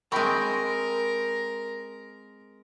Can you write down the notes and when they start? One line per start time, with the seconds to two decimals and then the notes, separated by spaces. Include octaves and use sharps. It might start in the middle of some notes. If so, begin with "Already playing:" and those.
0.12 G#3 C4 A#4 G5 B5 C#6